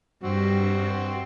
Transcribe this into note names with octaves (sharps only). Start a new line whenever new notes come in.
G2 C4 F#4